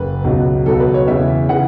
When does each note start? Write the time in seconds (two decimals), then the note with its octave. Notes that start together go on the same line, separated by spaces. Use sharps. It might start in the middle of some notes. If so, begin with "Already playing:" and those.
Already playing: F#1 B4
0.24 C#2 B2 F#3
0.66 C#2 B2 F#3 A4
0.80 B4
0.94 C#5
1.07 E2 C#3 E3 E5
1.49 C#3 E3 F#5